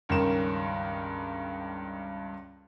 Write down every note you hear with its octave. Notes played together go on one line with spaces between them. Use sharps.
C#2 G2 D#3 C#4 A#4 E7